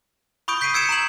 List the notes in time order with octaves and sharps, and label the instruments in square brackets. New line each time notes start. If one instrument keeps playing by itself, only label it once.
[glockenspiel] B5 C#6 D#6 G6 D7
G6 B6 C7 D7 D#7
E6 G#6 C#7 D7 E7
A#5 G6 F#7